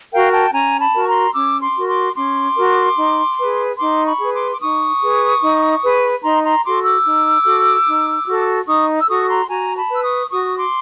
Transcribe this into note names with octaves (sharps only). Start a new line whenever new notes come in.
F#4 A#4 F5 G5
G5 A5
C#4 G#5 A#5
A5 B5
F#4 A#4
C#6
A#5 C6
C#4 D6 E6
C6 D6
F#4 A#4
C6 D6
C#4 C6 D6
F#4 A#4
D#4
G#4 B4
D#4 C6 D6
B5 C#6
G#4 B4
C6 D6
D6
D#4 C#6 D#6
G#4 B4
D#4
G#4 B4
D#4 A#5 C6
A#5 C6
F#4 A4 C6 D6
D6 E6
D#4
F#4 A4
D#4
F#4 A4
D#4 C#6 D#6
E6
F#4 A4 C#6 D#6
A#5 C6
F#4 G#5 A#5
A5 B5
B4 E6
C#6 D#6
F#4 C#6 D#6
C6 D6